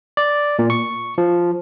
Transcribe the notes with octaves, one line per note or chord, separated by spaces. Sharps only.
D5
A#2
C#6
F3